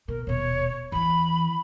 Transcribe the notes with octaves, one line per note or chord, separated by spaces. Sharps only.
B2 A#4
D#1 B2 C#5
E2 E3 B5